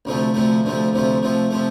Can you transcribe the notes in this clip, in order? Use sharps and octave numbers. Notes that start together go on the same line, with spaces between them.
D2 C3 F3 A3
D2 C3 F3 A3
D2 C3 F3 A3
D2 C3 F3 A3
C3 F3 A3
C3 F3 A3